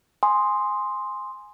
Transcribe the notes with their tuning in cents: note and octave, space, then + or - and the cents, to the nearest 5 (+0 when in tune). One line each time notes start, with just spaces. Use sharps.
G#5 +0 C6 +0 D#6 +0